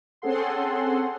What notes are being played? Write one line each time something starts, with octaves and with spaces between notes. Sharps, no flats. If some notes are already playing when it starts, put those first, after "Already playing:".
C4 C#4 G#4 A4 F#5 C6